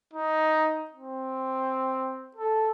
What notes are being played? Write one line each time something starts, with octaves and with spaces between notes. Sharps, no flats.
D#4
C4
A4